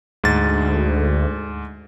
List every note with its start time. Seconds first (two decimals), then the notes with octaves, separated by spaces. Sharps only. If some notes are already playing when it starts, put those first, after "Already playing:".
0.24 D2 G#2 A6